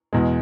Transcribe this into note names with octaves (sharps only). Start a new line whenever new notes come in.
E2 B2 G#3